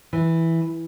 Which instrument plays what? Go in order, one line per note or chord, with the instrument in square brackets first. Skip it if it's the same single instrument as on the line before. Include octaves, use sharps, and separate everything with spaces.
[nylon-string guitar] E3